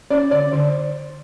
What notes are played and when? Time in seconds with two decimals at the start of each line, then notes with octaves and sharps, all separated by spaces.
0.10 C#4 D5
0.31 D3 D5
0.52 D3